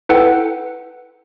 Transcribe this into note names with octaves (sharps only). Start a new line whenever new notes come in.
E4 A4 B4 F#5 G5